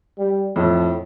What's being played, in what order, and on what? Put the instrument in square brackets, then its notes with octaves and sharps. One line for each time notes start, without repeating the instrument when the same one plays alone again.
[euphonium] G3
[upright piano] F2 [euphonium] A2